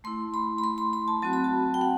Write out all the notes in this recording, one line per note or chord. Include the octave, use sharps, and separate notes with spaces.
A3 E4 C6
B5
B5
C6
B5
B5
A5
F#3 C4 F#4 A5
B5
A5
G5
F#5